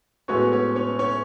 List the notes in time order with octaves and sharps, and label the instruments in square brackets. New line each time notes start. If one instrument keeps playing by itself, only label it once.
[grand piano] A2 G#3 B3 F#4 [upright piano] C#4 C#5
[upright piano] C#4 C#5
C#4 C#5
C#4 C#5